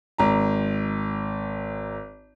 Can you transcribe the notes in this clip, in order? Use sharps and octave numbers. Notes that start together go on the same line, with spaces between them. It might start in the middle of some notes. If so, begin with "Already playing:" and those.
G#1 A#5